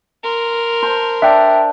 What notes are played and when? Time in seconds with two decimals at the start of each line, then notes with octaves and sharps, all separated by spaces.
0.23 A#4 C6
0.82 C5 A5
1.22 D4 E5 G5